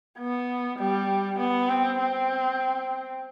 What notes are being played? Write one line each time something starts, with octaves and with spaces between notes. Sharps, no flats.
B3
G3
B3
C4
C4